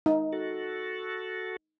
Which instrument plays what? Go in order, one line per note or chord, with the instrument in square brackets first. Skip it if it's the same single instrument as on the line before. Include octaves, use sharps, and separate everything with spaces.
[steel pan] D#4
[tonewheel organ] F#4 A4